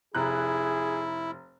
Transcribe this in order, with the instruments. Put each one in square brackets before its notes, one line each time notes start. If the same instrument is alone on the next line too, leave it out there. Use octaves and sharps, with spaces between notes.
[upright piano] F1 A#5 F#6 [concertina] E4 [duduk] G#4